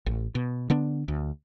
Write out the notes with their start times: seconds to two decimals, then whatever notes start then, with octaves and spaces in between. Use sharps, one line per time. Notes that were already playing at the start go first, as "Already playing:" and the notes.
0.06 A1
0.35 B2
0.70 D3 B3 D4
1.08 D2